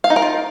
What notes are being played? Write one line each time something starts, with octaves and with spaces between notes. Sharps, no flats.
F5
D#4
A#4
F4